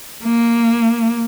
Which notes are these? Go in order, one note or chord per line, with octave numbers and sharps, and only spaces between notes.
A#3